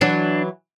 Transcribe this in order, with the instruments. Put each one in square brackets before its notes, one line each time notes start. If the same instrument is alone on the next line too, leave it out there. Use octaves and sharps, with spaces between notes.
[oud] E3 F#3 [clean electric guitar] D4